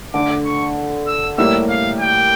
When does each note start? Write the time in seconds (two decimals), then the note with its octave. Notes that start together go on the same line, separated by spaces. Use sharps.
0.13 D3 A3 D4 D6
0.45 C#6
1.07 E6
1.38 A2 G3 A#3 E4 G4 E6
1.69 F5
2.00 G5